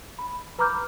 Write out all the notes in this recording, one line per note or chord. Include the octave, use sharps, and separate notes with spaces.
B5
B4 A#5 B5 D6 F6 G6